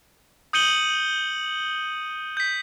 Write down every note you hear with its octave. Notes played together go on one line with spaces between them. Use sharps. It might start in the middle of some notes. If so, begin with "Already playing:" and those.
D#6 G6 C#7 D#7 F#7 G7
G6 B6